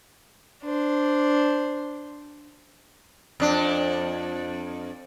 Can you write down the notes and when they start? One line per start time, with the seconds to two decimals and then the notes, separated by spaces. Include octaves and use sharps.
0.63 D4 C5
3.40 F2 D4